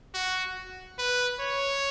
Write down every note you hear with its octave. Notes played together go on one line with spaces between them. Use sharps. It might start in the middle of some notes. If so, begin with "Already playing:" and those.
F#4
B4
C#5